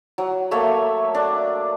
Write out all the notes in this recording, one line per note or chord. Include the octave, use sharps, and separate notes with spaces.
F#3
A3 A#3 C#5 E5
D4